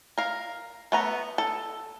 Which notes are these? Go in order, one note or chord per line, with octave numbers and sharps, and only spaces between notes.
A#4 F5
A3 B3 A#5
A4